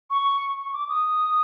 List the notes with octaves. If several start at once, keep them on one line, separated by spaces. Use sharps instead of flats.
C#6
C#6
D6
D#6